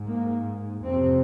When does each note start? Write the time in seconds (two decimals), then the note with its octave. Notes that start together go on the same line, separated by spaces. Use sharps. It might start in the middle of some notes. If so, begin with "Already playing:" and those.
Already playing: G#2
0.08 A#3
0.83 F2 C3 C4